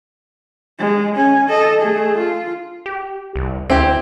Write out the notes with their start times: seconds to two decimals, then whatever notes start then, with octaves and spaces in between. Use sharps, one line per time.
0.79 G#3
1.15 C#4 G#5
1.49 A4 D#5
1.81 A3 G#4
2.18 F4
2.86 G4
3.36 C2
3.70 D2 C4 E4 G4